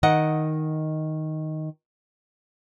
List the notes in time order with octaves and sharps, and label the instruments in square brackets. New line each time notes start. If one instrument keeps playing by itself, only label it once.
[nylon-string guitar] D#3 D#5 F#5